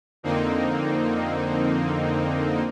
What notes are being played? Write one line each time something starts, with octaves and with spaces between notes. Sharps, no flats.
F2 D3 A#3 C4 D#4